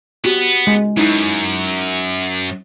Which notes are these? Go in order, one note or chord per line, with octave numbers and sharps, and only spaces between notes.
B3 F#4 G4
G#3
F#2 D#4 E4